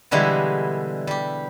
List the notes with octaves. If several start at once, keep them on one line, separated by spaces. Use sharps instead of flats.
B2 D3 E3 G3 G#3 E4
G3 G4